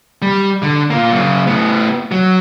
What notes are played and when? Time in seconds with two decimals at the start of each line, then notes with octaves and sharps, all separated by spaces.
0.22 G3
0.62 D3
0.90 A#3 F4
1.12 F#2 C#3
1.47 A2 B3
2.11 F#3